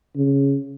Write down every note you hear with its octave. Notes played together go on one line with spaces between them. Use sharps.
C#3